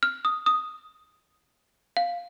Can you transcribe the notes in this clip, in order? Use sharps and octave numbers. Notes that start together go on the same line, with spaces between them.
F6
D#6
D#6
F5